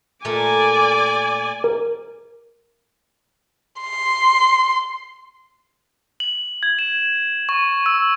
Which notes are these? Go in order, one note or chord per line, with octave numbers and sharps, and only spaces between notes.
A#2 A3 A#4 D5 G#5
A#4
C6
F#7
G#6
E7
C#6
E6